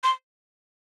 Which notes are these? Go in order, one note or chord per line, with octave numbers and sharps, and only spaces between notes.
C6